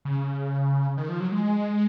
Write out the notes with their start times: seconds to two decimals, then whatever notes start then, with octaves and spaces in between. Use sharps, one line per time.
0.05 C#3
0.97 D#3
1.09 F3
1.20 F#3
1.32 G#3